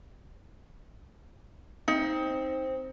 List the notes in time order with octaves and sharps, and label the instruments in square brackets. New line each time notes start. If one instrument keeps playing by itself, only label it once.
[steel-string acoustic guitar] C4 [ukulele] D#4